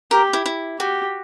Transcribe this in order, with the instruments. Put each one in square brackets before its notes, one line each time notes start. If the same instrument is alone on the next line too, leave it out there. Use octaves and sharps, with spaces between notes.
[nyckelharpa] G4 [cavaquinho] A#4
[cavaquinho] E4
E4
[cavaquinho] F#4 [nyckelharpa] G4